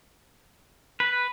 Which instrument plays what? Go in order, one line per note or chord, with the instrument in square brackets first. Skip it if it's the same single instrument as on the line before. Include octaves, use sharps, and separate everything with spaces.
[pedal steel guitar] B4